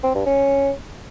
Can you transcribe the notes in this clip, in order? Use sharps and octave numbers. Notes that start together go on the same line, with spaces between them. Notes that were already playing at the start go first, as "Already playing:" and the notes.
C4
G2
C#4